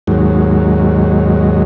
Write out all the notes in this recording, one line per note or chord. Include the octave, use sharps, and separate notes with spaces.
D#2 G#2 F#3